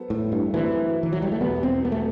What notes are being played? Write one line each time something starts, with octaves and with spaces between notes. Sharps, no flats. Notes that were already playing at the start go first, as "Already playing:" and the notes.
Already playing: F#3 B3 A4 C5
A2
G2
F#2 E3 F#3 A3 C4 E4
E3
F#3
G3
A3
E2 B2 G3 B3
C4
B3
A3